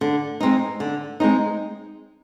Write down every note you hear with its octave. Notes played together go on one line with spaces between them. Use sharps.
D3
G#3 C4 D#4
D3
G#3 C4 D#4